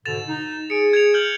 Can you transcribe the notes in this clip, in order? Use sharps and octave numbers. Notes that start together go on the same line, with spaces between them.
G#2 B2 D3 A6 E7 F7
D#4
G#4 C#7 D7
G#6 C#7 F7
F6 G6 F#7